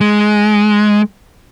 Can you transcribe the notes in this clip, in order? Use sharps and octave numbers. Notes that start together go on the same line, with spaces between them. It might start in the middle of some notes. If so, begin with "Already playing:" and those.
G#3